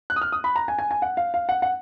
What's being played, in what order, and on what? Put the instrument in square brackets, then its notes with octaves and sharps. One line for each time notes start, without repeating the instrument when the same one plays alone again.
[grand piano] F#6
D#6
F6
D#6
B5
A#5
G#5
G#5
G#5
F#5
F5
F5
F#5
F#5